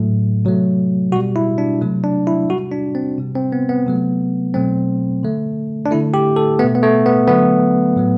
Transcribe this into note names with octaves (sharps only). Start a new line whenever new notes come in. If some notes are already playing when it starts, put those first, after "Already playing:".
Already playing: A2 F#3 A3
C3 F#3 A3
B2 G3 F#4
E4
D4
C3 F#3 A3
D4
E4
C3 G3 F#4
D4
C4
C3 G3
C4
B3
B3
C3 F#3 A3
B2 F#3 A3 C4
D3 A3
D4
D3 A3 E4
G4
A4
B2 A3 B3
B3
A3
B3
D3 F#3 A3 B3
A2 F#3 A3